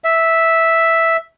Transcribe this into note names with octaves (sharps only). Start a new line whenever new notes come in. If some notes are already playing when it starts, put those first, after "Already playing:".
E5